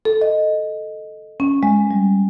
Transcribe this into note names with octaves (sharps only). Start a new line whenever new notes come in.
A4
D#5
C#4
G#3
G3